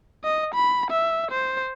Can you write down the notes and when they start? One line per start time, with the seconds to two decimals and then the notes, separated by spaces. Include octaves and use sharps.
0.24 D#5
0.54 B5
0.91 E5
1.31 C5